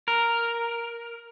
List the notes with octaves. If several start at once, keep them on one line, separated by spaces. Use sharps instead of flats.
A#4